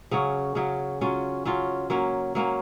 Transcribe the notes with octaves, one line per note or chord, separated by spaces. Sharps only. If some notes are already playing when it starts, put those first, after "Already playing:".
C#3 F#3 C#4 F#4
C#3 F#3 C#4 F#4
F#3 C#4 F4
F#3 C#4 F4
F#3 A#3 C#4
F#3 A#3 C#4